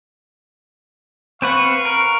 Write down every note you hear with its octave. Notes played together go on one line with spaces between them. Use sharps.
C4 B4 F5 F#5 C#6
A#4